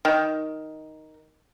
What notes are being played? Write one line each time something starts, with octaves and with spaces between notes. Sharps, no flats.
D#3